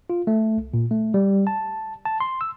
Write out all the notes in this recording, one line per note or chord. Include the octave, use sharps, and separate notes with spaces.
F4
A3
C2
A#2
A3
G3
A5
A5
C6
E6